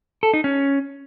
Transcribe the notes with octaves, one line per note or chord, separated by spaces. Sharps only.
A4
D#4
C#4